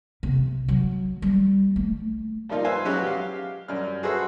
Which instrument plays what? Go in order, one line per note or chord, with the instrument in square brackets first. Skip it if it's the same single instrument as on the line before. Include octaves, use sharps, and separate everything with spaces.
[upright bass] C3
F#3
G3
A3
[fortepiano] F3 G3 A#3 D#4 F4
B4 C5 E5 F5 G#5
F#3 G#3 C#4 F#4 G4
G4 F5
F#2 G3 F6
F#4 G#4 A4 B4 C5 E5